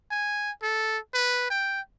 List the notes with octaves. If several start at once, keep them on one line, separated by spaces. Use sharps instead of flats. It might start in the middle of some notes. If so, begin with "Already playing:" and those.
G#5
A4
B4
G5